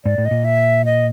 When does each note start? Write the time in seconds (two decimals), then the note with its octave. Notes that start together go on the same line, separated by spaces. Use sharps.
0.05 G#2 D5
0.18 A2
0.25 D#5
0.31 A#2
0.45 E5
0.85 D#5